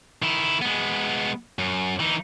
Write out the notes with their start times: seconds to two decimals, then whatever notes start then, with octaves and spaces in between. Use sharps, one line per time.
0.22 D#3 E4
0.62 G#3 B3
1.59 F#2
2.00 E3 D#4